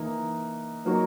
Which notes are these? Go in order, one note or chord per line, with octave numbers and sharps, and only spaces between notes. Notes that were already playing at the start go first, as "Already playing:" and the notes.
Already playing: E3 A#3 D#4
F#3 A#3 D#4 F#4